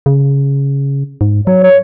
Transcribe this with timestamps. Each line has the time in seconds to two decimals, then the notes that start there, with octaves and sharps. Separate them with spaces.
0.06 C#3
1.21 G#2
1.47 F#3 C#5
1.63 C#5